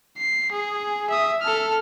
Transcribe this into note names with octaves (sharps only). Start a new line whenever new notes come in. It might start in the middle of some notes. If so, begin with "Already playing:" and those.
C7
G#4
E5 D#6
A4 F6